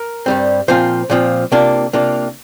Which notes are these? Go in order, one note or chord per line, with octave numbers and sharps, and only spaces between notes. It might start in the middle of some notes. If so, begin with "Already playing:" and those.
Already playing: A#4
G2 G3 C4
A#2 F3 C4 F4 C5
A#2 F3 C4 F4
C3 A#3 D4 F4
C3 A#3 D4 F4